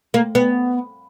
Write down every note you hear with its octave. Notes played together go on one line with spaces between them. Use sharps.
A#3
B3